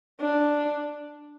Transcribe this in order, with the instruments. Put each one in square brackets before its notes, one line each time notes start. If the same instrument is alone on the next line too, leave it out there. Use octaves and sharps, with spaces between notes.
[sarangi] D4